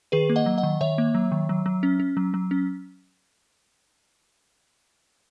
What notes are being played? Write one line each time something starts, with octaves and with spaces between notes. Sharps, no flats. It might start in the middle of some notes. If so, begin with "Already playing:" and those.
D#3 G#4 B4
A#3
D#5 F#5
F#3
D#5 F#5
D#3
D#3 C#5 E5
A#3
F#3
D#3
F#3
F#3
C#4
C#4
F#3
F#3
C#4